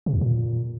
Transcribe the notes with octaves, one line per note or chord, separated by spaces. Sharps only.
C3
E2
A#2